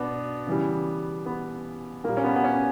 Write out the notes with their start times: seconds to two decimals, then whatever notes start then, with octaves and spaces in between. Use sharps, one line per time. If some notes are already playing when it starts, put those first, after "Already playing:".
Already playing: B2 B3 D4
0.47 C#3 E3 G3
1.26 B3
2.04 A#2 G3 A#3
2.17 C#4
2.24 B3
2.36 B3
2.44 C#4